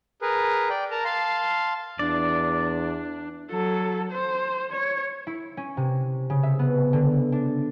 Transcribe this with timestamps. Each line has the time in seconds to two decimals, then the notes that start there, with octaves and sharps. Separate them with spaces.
0.22 G#4 A#4 B4
0.70 D5 G5
0.91 A#4 A5 A#5
1.05 F5 A5 C6
1.99 E2 D4 D5
3.51 F#3 A4
4.12 C5
4.72 C#5
5.27 E4
5.57 C#4
5.77 C3
6.30 C#3
6.43 E5
6.59 B3
6.93 D3
7.32 D4